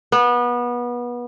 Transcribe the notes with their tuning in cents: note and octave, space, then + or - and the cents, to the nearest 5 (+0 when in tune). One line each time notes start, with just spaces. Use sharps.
B3 -25